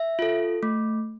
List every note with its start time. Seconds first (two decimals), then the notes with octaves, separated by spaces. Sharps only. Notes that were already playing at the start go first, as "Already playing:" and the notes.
Already playing: E5
0.19 F4 A4
0.63 A3